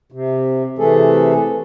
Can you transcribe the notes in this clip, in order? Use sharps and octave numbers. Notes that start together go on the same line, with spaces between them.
C3
C3 E3 A3 G#4 A4